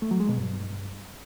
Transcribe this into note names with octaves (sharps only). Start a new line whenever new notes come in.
A3
F#3
G#3
B2
G2